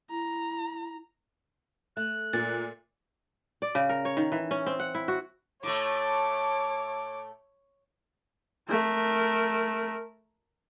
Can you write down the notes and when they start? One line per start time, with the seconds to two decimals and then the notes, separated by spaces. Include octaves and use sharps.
0.10 E4 A#5
1.97 A3 F#6
2.33 A#2 A6
3.62 D5
3.75 C#3
3.89 A#4
4.05 C#5
4.17 D#3
4.32 E3
4.51 C#4
4.66 C4
4.80 F#5
4.95 E4
5.08 F#4
5.63 A2 A3 C#5 D6
8.70 A3 A#4